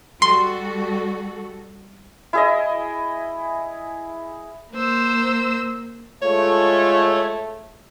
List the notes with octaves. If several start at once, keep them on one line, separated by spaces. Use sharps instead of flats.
G3 F#4 A4 C6
E4 G#4 D#5
A#3 C5 E6
G#3 A3 F4 C#5